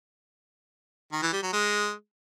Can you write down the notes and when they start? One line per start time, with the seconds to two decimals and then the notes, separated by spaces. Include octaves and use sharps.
1.12 D#3
1.22 E3
1.33 G3
1.43 F#3
1.53 G#3